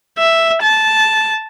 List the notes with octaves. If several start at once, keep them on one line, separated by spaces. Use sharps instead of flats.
E5
A5